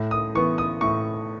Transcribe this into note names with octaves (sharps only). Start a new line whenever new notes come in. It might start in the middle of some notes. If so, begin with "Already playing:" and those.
Already playing: A2
D#6
E3 B3 C#6
D#6
A2 C#6